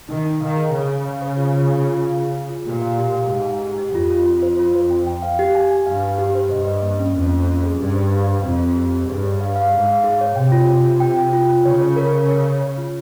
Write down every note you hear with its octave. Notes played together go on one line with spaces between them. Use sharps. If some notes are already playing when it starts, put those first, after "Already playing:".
D#3 D#4
D#4
D#3 F5
G#4
C#3 G#4
G#4
F5
C5
F4
F4
G#4
F4
F5
G#4
G#4
F4
A#2 G4
F5
G4
F5
G#2 G4
G#5
G4
G4
F2 F4
F4
F4
C5
F4
C5
G5
G5
F5
G4
G#5
G#5
G2 F5
G4
G4
C5
G2 D#5
D#5
A#3
C#4
F2 A#3
A#3
C#4
G#4
G2 G4
C5
F5
C5
F2 C4
C4
G4
G4
G2 G#4
C#5
F5
F5
G#2 G#4
F5
G#4
C#5
C3 G5
F4
F4
F4
G5
G5
F4
F4
C#3 C#5
C#5
A#4
C#5
C#5
C#5
C#5
F4